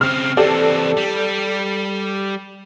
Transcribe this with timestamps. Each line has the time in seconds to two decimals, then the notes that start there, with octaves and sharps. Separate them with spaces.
0.01 C#3 C4 F6
0.37 E3 C4 G4 A4 D5
0.97 G3